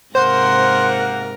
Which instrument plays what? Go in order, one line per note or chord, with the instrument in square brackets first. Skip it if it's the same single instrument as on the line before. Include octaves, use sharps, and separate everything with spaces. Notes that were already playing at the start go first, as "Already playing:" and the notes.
[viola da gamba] G#2 C3 A#4 [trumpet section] A#3 F#5 [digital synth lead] C5 [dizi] C6